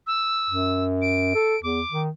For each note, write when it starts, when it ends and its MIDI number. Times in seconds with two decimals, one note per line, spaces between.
0.07 0.84 88
0.50 1.33 42
1.02 1.63 98
1.35 1.56 69
1.63 1.81 40
1.63 2.01 86
1.92 2.09 51